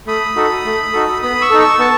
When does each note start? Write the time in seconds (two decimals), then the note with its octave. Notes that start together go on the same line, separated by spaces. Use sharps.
0.07 A3 B5 D#6
0.36 D#4 F#4 A4
0.65 A3
0.93 D#4 F#4 A4
1.22 B3 B5 D#6
1.41 C#6 E6
1.50 D#4 A4
1.60 C#6 E6
1.79 B3 A5 C#6